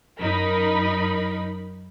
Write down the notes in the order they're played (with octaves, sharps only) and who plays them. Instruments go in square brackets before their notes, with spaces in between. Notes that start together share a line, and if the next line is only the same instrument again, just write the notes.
[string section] F#2 D#4 A#4 B5